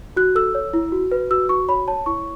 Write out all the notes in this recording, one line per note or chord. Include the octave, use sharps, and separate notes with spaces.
F#4 F#6
A4 E6
C#5
E4
F#4
B4
F#4 E6
F#4 C#6
C#5 B5
C#5 A5
E4 C#6